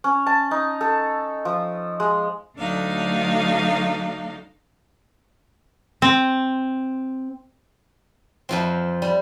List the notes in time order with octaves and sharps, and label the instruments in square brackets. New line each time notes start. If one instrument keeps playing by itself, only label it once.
[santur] C#4
A5
D#4
A4
F3
G#3
[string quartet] D2 F#3 A3 D4 D#4 F5
[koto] C4
[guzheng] F2 F3 C4
G3